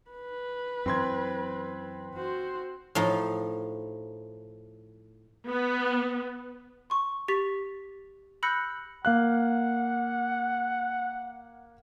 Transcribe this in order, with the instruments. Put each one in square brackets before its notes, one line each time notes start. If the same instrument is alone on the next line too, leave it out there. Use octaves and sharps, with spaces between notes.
[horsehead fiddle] B4
[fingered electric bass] F#2 E3 [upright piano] C4 C6 G#6
[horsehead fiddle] F#4 C5
[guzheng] A2 F3 D#4
[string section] B3
[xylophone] C6 C#6
G4 C#6 A6 B6
B5 E6 F#6 G6 A#6 C#7
[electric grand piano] A#3 F5 F#6 [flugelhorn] F#5